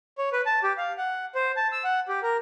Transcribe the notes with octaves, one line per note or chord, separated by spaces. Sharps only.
C#5
B4
A5
G4
F5
F#5
C5
A5
E6
F#5
G4
A#4